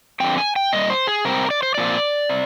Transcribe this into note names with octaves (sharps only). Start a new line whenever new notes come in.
D3 F3 C4 G5
G#5
G5
A#2 G3 D#5
C5
G#4
C3 G3 C4 A#4
D5
C5
A#2 F3 C4 D5
C3